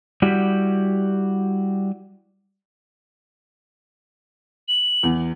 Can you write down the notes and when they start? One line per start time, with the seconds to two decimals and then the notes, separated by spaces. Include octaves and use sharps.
0.22 G3 E4 F#4 G4
4.68 F#7
5.03 E2